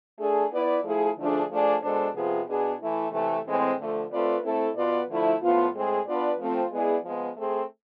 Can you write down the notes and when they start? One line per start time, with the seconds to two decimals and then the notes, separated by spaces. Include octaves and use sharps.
0.19 A3 D4 G#4
0.52 B3 E4 B4 D5
0.84 F3 A3 E4 G#4
1.17 D3 F3 A3 D4 G#4
1.50 F3 A3 D4 G#4 D5
1.82 B2 G#3 D4 A4 C5
2.15 C3 F3 B3 F4 G#4
2.47 B2 B3 D4 G#4
2.80 E3 A3 E4
3.12 C3 E3 A3
3.45 A2 E3 G#3 C4
3.78 D3 F3 A3
4.11 A3 C4 F4 B4 D5
4.43 A3 C4 E4 A4
4.75 B2 B3 F4 B4 D5
5.08 D3 F3 A3 E4
5.41 A2 F3 B3 F4
5.73 A2 G#3 C4 G#4
6.06 B3 D4 F4 B4 D5
6.38 F3 A3 C4 F4
6.71 G#3 B3 E4 G#4 D5
7.04 F3 G#3 B3
7.36 A3 C4 G#4